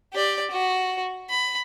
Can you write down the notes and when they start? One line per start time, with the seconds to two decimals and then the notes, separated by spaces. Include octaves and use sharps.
0.14 G4 D5
0.51 F#4
1.30 B5